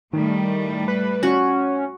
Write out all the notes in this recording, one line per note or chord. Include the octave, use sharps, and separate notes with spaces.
A2 D#3 G3 A3
B4
C#4 F#4